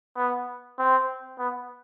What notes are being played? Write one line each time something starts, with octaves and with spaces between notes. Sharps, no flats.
B3
C4
B3